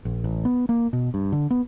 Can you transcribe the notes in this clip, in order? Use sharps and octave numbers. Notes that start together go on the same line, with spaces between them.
A#1
A1
B3
A#3
B2
G2
D3
B3